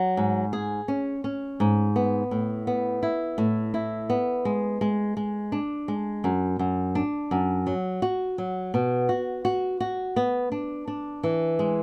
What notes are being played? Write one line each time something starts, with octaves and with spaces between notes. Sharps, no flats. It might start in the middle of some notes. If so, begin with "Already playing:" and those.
Already playing: F#3
G#2
G#4
C#4
C#4
G#2
B3
A2
B3
E4
A2
E4
B3
G#3
G#3
G#3
D4
G#3
F#2
F#2
D4
F#2
F#3
F#4
F#3
B2
F#4
F#4
F#4
B3
D4
D4
E3
G#3